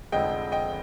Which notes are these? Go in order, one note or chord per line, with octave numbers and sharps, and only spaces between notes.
F1 F2 D3 G#3 D#5 G5
D#5 G5